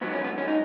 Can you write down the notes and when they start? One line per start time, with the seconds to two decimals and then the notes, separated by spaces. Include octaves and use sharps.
0.01 G#2 F#3 B3
0.13 C#4
0.24 B3
0.38 C#4
0.48 D#4